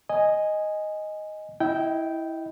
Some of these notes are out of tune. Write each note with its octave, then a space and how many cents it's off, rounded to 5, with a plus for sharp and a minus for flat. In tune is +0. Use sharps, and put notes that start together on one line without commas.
D#5 +0 G#5 -5
E4 -10 D#5 +20 G5 -10